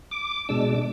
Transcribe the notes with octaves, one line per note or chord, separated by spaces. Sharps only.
D6
B2 G#3 D4 E6
D6
D6